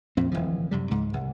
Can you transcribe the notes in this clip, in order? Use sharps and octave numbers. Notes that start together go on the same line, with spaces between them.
A#1 F2 A#2 C4
D1 B1 E3 F3
F#2 C3 G3
C#2 G#2
C2